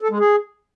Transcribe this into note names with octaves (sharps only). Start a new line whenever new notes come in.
A4
G#3
G#4